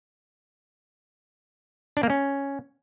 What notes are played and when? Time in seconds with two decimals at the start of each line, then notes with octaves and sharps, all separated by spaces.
1.97 D4
2.03 A#3
2.10 C#4